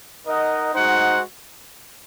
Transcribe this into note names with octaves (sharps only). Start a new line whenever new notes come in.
D#4 A#4 D#5 F#5
G#3 D#4 F#4 C5 F#5